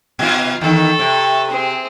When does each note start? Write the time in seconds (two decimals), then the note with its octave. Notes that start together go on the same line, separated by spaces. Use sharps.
0.19 B2 F4
0.61 E2 D#3 A4 C#6
0.99 C3
1.50 C4 G#4